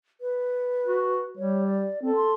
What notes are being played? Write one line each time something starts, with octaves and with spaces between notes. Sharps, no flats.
B4
F#4
G3 C#5
D5
C4 A4
C6